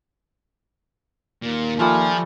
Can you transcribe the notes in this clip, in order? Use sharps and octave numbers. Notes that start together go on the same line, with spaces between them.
D#2 A#2 A#3
F3 G3 A3 F4 G#5